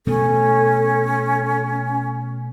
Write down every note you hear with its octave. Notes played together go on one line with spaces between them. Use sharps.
B2 A3 B3 C#4 A4